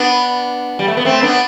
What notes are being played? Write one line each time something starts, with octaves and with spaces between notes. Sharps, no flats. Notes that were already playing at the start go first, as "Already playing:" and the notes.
Already playing: B3 D4
G3
A3
B3
A3 C4
B3 D4